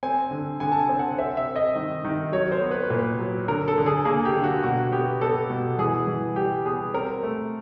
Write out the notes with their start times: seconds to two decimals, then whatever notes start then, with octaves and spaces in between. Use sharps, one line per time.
0.03 C4 G#5
0.31 D3
0.60 D3 G#5
0.72 A5
0.79 G#5
0.89 C4
0.99 F#5
1.18 C4 E5
1.37 E5
1.47 C4
1.56 D#5
1.76 D#3
2.04 D#3
2.32 F#3 C#5
2.52 C5
2.61 B3
2.71 B4
2.90 A#2 B4
3.19 F#3
3.48 D3 A#4
3.68 A4
3.78 D3
3.86 G#4
4.05 A#3 G#4
4.25 G4
4.35 D3
4.44 F#4
4.63 B2 F#4
4.92 B3 G4
5.21 B3 A4
5.50 B2
5.78 E3 G#4
6.07 E3
6.36 G3 G4
6.65 B3 G#4
6.94 C4 A#4
7.23 A3